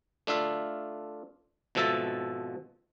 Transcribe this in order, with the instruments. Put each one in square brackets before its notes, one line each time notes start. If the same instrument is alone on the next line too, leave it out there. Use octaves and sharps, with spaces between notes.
[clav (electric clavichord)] A3 D4 F4 E5 F5
G#1 B2 F3 A4 E5 A5